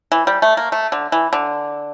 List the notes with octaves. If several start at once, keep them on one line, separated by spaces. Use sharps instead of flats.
E3
G3
A3
A#3
A3
D3
E3
D3